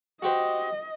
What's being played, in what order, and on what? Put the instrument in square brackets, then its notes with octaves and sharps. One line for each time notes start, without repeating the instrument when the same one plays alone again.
[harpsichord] F#4 G4 C5 [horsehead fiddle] D#5